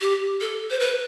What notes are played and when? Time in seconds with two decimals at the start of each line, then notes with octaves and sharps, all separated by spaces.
0.01 G4
0.41 A4
0.70 C5
0.79 B4